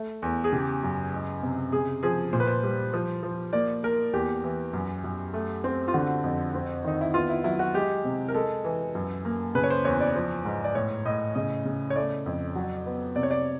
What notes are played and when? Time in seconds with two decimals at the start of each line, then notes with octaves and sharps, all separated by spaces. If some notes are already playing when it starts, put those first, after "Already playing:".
Already playing: A3
0.22 E2
0.44 G#4
0.52 C#3 G4
0.83 F#2
1.13 G#3
1.43 C3
1.72 C#3 G#4
2.03 F3 G#4
2.33 A#2 C5
2.40 B4
2.47 C5
2.63 G3
2.94 F3
3.23 F3
3.53 A#3 D5
3.83 A#3 A#4
4.13 E2 G4
4.44 E3
4.73 F#2
5.04 F#2
5.34 A3
5.64 C4
5.88 F4
5.94 D3 F#4
6.24 F2
6.55 C4
6.85 D#3 D#4
7.01 E4
7.14 B3 F4
7.30 E4
7.44 F#3 E4
7.59 F#4
7.74 G#3 G4
8.04 C3
8.28 A#4
8.35 G#3 A4
8.65 E3
8.95 F#2
9.25 A#3
9.55 C#3 B4
9.63 C#5
9.70 C5
9.85 E2 C#5
10.01 D5
10.15 F3
10.45 G#2
10.64 D5
10.75 A2 C#5
11.05 A2 D#5
11.35 C#3 D#5
11.65 C#3
11.90 C#5
11.96 A3 D5
12.26 F2
12.56 F#3
12.86 B3
13.16 C3 D5
13.23 C#5
13.31 D5